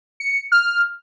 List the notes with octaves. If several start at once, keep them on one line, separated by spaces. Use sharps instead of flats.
C#7
F6